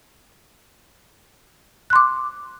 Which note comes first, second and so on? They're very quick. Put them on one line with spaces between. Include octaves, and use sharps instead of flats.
F#6 C6 D6